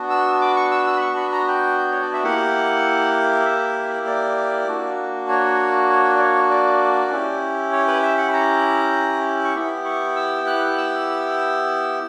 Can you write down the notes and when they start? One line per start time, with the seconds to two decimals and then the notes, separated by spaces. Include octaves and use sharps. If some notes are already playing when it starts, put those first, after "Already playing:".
Already playing: B3 D4 F#4
0.10 E6
0.41 D6
0.56 C#6
0.71 E6
0.87 E6
0.97 B5
1.01 C#6
1.17 B5
1.32 A#5
1.48 G5
1.92 C#5
2.02 D5
2.13 E5
2.24 A#3 E4 G4 F#5
3.46 E5
4.07 D5
4.68 A#3 D4 F#4
5.29 C#5
5.90 C#5
6.16 D5
6.20 C#5
6.51 D5
7.11 C#4 E4 G4
7.72 C#5
7.88 B4
8.03 E5
8.18 F#5
8.29 B5
8.34 A#5
9.45 C#6
9.55 B3 E4 G4 B5
9.85 C#6
10.16 E6
10.47 F#6
10.78 E6